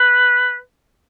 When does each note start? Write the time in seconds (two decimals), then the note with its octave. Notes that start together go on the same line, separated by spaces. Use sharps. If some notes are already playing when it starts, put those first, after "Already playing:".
Already playing: B4